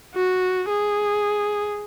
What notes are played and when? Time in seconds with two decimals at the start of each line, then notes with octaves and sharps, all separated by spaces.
0.15 F#4
0.70 G#4